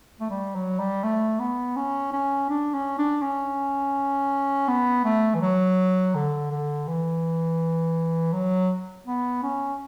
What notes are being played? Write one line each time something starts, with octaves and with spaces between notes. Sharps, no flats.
A3
G3
F#3
G3
A3
B3
C#4
C#4
D4
C#4
D4
C#4
B3
A3
E3
F#3
D3
D3
E3
F#3
B3
C#4